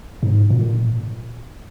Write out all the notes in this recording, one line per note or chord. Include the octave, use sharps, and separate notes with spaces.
G#2
A#2